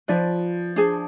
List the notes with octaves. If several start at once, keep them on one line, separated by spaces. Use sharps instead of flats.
F3 F4 B4 D5
D4 G#4 C5